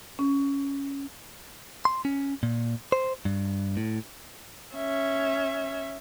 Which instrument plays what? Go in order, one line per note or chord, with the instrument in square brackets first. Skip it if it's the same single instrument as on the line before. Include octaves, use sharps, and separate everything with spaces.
[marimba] C#4
[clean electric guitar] C6
C#4
A#2
C5
G2
A2
[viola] C#4 E5